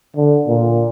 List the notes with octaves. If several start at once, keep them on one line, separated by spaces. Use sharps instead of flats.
D3
A#2